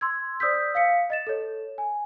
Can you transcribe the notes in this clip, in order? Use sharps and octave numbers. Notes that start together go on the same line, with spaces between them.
C6 E6 G#6
C5 D5 D#6 E6 G6 B6
F5 B6 C#7
D#5 A6 E7
A4 C#5
G#5